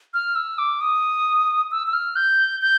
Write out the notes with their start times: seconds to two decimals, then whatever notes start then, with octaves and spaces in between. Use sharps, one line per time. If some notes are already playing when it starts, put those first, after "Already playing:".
0.14 F6
0.36 E6
0.58 D6
0.81 D#6
1.71 E6
1.87 E6
1.93 F6
2.16 G6
2.61 G6